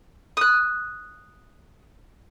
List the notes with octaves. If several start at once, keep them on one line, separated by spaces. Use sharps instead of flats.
D#6 F#6